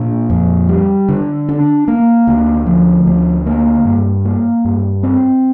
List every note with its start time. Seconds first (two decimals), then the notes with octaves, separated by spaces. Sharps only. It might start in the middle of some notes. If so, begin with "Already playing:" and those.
Already playing: A#2 D4
0.30 F2
0.69 G3
1.09 D3
1.49 D4
1.88 A#3
2.27 D2
2.67 F3
3.06 D2
3.46 A#3
3.85 G2
4.25 A#3
4.65 G2
5.03 C4